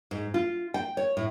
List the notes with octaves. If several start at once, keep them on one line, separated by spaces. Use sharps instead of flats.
G#2
F4
G5
C#5
A2